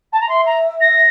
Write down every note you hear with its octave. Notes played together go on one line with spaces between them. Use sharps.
A5
A#5
E5 C6
A#5
A#6